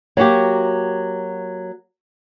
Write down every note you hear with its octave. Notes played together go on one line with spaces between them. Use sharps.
F#3 A#3 F#4 G4